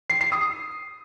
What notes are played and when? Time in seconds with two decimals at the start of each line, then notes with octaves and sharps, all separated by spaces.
0.10 C7
0.21 C7
0.32 D#6